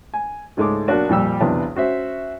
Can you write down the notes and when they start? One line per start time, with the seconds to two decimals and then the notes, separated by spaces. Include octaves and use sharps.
0.14 G#5
0.57 C#2 G#2 G#3 A3 D6
0.88 B1 A#3 D4 F#4
1.09 F2 A#2 G3 E6
1.40 B1 E2 C3 B3 D4 A5
1.75 C#4 F#4 C5 E5